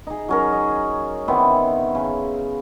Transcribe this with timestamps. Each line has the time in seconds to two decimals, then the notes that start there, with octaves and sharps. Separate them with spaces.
0.07 D#4 G#4
0.28 F#3 C#4 A#4
0.52 D#5
1.28 D#3 B3 C4 E4
1.95 C#3